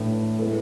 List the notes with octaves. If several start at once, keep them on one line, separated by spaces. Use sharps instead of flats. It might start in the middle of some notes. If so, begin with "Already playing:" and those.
Already playing: A2 E3 A3 D4
G#3 B3 E4 A4